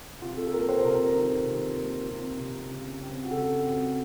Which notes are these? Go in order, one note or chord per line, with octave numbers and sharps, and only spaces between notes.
C3 F4
A4
A4
A#3 A#4
C5
C3 A#4
D#3
C3
A#3
C3
C3
C#3
C4
F#4
C#3 A4
C4